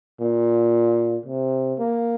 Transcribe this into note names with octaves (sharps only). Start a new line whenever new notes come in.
A#2
C3
A#3